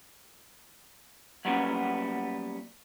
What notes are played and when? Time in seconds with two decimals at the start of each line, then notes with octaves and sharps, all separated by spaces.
1.45 F#3 G3 A#3 B3 C#4